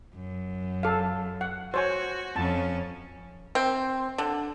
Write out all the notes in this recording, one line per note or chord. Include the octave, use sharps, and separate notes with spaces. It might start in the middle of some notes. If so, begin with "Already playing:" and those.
F#2
A4 F5
F#5
F#4 C5 C#5 G#5
F2 C#4 A5
C4
D3